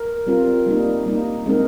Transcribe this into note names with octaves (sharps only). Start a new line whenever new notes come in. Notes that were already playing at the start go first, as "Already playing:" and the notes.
Already playing: A#4
G3 C4 F4 A#4
G3 A#3 D#4
G3 A#3 D#4
G#3 C4 D#4 A#4